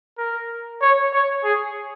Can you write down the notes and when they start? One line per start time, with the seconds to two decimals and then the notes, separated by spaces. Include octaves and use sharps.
0.18 A#4
0.82 C#5
1.13 C#5
1.44 G#4